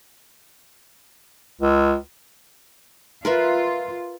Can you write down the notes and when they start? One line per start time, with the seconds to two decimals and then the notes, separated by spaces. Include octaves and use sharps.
1.61 C#2
3.25 F4 A#4 B4 E5